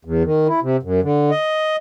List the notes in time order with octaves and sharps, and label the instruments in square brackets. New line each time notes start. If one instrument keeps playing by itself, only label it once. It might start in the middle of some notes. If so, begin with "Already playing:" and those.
[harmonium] E2
D#3
E4
C3
F#2
D3
D#5